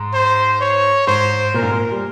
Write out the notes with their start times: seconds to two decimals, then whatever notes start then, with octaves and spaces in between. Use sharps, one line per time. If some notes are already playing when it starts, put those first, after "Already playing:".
Already playing: G#2
0.14 C5
0.61 C#5
1.07 G#2 C5
1.54 A#2 A#4
1.63 G#2
1.71 A#2
1.91 G3